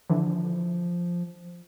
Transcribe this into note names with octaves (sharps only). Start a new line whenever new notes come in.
D3 E3 F3